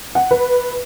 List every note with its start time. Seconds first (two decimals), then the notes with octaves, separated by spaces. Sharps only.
0.15 F#5
0.31 B4